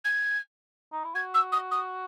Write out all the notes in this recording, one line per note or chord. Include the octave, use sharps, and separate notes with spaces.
G#6
D#4
E4
F#4 G#6
E6
D#6
D#6